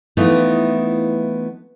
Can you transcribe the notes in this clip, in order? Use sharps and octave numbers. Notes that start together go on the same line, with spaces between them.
E3 F3 A3 B3 D#4 E4